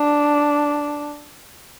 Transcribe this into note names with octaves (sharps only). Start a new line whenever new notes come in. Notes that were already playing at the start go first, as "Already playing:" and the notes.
Already playing: D4